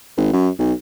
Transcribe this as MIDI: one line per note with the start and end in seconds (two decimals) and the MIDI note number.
0.17 0.31 32
0.33 0.49 42
0.59 0.72 35